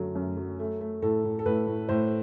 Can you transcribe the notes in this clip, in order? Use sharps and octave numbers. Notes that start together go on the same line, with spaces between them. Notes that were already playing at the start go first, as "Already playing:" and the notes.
Already playing: F#2 D3 F#3 A3
F#2
F#3
A3
A3
A2 A4
A2
A4
A2 B4
A2
A2 C5